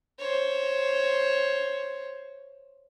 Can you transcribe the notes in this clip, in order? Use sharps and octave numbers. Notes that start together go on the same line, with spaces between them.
C5 C#5